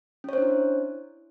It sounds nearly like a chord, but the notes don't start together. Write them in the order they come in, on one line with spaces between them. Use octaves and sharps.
C#4 C#5 C5 D4 E4